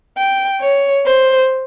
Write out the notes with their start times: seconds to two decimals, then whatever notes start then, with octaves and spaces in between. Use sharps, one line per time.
0.18 G5
0.61 C#5
1.06 C5